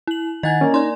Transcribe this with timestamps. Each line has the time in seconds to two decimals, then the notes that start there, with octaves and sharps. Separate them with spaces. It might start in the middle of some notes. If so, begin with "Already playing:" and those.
0.07 E4 F#7
0.43 D#3 D#5 F#5 G#5 A6
0.61 A#3 C#4 D4 A#4
0.74 D#4 D5 C6